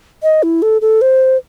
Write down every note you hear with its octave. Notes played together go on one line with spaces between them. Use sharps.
D#5
E4
A4
A4
C5